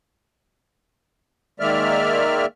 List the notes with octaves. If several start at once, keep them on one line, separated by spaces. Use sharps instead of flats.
D#3 G#3 A#3 D5 E5 F6